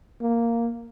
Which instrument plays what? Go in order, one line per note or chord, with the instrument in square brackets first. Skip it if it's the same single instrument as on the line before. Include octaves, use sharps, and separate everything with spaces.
[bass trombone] A#3